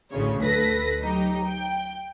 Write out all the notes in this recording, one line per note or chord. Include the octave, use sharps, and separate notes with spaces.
A1 D2 C#3 C#5
D2 A4 B4 A#6 B6
F#3 D#4 G4
G5